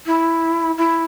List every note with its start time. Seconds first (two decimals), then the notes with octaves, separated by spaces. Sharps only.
0.06 E4
0.77 E4